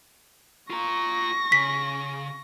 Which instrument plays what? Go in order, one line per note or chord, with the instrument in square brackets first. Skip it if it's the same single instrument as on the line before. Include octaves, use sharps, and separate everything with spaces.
[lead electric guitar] F4 A#5 [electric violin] C#6 A#6
[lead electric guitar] C#3 [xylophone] B6